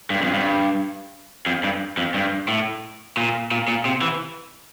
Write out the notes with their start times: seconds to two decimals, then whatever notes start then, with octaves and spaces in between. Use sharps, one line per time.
0.10 G2
0.22 F2
0.34 G2
1.46 F2
1.64 G2
1.97 F2
2.14 G2
2.48 A2
3.17 A#2
3.51 A#2
3.68 A#2
3.85 C3
4.02 E3